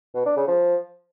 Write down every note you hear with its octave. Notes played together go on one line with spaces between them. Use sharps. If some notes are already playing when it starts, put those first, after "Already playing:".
B2
D4
C#3
F3